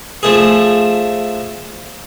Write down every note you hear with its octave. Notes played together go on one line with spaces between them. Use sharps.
F3 A3 G#4